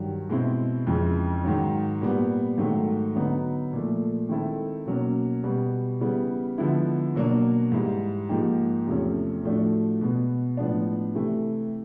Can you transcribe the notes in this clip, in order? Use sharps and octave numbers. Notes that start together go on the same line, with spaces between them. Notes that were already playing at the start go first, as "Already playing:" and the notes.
Already playing: G2 D#3 F#3
B2 G#3 C4 E4
F2 C#3 E3 G#3
G#2 D#3 F#3
A#2 G3 B3
G#2 D#3 F#3 A3
D3 F#3 B3 D#4 F#4
A#2 F3 A3
D#3 G#3 C4 E4 A4
B2 F#3 A#3 C#4
B2 G3 B3
C#3 E3 G3 B3
D3 F3 G#3 B3 E4
B2 F#3 A#3 D4
G#2 E3 G3
G#2 F3 A#3 D#4 G4
E2 C3 F3 A3 C#4
A2 F3 A3 D4 F#4
B2 G#3 B3
A2 F3 G#3 B3 D4
C3 E3 A3